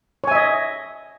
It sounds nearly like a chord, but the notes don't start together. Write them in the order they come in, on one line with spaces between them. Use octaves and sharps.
C#5 G#5 E5 D#5